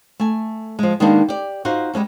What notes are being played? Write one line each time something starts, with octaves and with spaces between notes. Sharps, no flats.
A3 G#5
F3 G#3
D#3 G#3 A#3 B3 D4 G4
G4 D5
D#4 F4 F#4 C5
G3 G#3 C#4 F#4